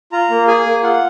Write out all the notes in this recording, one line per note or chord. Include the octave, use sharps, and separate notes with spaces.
F4 A#5
A#3
G#4 G#5
A#3
F4 F#5